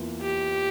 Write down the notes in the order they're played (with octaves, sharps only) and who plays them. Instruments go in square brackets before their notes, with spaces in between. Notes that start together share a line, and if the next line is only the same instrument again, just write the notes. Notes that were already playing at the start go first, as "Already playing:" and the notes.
Already playing: [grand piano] E2 E3 A#3 F4
[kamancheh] G4